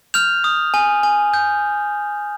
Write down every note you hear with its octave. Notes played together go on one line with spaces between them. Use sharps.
F6 G6 F7
D#6
G#5
G#5
G6